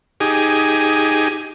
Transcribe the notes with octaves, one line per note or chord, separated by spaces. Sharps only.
D#4 G4 G#4 G#5